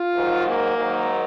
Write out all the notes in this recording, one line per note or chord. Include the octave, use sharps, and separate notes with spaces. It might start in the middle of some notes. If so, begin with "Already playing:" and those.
Already playing: F4
G#2 D#3 F#3
A#3
G#2 D#3 F#3